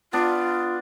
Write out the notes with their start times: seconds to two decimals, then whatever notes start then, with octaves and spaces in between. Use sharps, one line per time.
0.13 B3 D4 F4